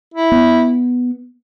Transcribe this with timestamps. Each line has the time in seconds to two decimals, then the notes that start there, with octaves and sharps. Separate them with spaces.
0.14 E4
0.32 B3